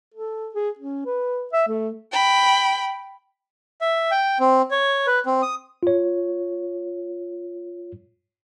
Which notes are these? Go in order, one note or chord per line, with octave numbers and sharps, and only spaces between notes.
A4
G#4
C#4
B4
E5
A3
G5 B5
E5
G5
C4
C#5
B4
C4
D#6
F4 C#5